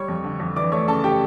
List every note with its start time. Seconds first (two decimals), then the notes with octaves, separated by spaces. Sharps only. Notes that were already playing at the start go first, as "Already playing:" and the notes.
Already playing: G3 C#5 C#6
0.08 F2
0.24 D3
0.40 F2
0.56 E3 D5 D6
0.72 A3 C#5 C#6
0.88 C#3 A4 A5
1.04 G4 G5